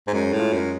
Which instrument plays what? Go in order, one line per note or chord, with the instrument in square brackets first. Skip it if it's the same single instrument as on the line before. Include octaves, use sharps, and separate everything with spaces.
[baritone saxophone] G#2
[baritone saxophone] F#2 [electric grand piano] G#3
[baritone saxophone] A2
[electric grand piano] F4
[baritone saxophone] F#2